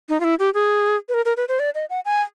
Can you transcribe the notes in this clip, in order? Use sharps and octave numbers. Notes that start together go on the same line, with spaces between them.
D#4
F4
E4
G4
G#4
B4
A#4
A#4
B4
C5
D5
D#5
F#5
G#5